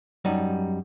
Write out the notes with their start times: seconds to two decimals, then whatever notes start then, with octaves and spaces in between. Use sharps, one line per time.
0.25 F#2 G3 D#4